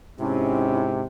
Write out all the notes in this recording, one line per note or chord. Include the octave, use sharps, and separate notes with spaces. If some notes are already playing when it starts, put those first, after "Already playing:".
G#2 C3 C#4 E4